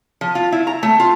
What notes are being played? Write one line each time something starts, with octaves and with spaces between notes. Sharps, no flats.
F3
F4
E4
A#5
A3
F4